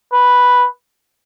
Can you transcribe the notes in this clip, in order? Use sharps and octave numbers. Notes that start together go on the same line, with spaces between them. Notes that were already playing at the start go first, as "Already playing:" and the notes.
B4